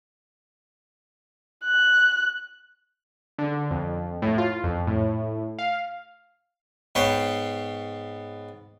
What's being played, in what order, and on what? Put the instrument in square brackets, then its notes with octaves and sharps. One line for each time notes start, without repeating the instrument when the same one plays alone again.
[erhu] F#6
[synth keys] D3
F2
A2
F4
F2
A2
F5
[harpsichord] G#2 B3 B4 C#5 G5 C6